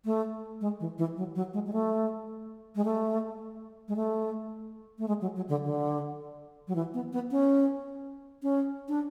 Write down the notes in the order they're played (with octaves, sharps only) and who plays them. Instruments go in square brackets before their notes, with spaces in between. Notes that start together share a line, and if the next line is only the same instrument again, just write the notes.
[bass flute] A3
G#3
E3
E3
F#3
F#3
G#3
G#3
A3
G#3
A3
G#3
A3
A3
G#3
F#3
F#3
D3
D3
F#3
E3
B3
B3
C#4
C#4
D4